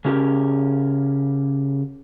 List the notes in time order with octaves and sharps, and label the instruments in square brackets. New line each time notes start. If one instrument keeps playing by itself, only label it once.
[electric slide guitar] C#3 C#4 G4 A#4